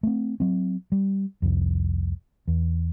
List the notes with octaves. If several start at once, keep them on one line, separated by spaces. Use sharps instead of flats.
A3 C4
F#3 C4
G3
C2 F2
E2